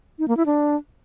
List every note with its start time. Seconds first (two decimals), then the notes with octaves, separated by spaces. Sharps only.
0.19 D#4
0.28 A#3
0.37 E4
0.46 D4